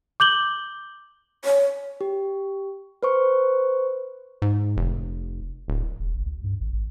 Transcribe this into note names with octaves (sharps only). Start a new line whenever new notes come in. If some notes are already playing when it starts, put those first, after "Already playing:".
D6 G6 F#7 G7
C#5
G4
B4 C5 C#6
G#2
F1
D1
E1
G#1
D2
G2
G#1
G#1